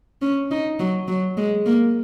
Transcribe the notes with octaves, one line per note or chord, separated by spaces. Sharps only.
C#4
D#4
F#3
F#3
G#3
A#3